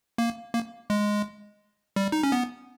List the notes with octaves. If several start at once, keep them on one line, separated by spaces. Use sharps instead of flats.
A#3
A#3
G#3
G3
D#4
C#4
B3